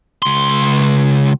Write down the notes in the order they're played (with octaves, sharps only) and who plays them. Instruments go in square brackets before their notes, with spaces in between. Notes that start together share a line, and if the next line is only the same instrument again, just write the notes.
[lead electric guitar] C#2 C6